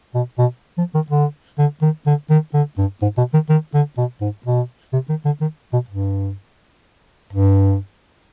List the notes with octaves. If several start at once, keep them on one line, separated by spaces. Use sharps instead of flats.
B2
B2
F3
D#3
D3
D3
D#3
D3
D#3
D3
G2
G#2
B2
D#3
D#3
D3
B2
G#2
B2
C3
D#3
D3
D#3
B2
G2
G2